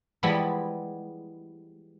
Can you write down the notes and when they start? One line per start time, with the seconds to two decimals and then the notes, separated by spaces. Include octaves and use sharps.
0.23 E3 F3 G3 G#3 B3 E4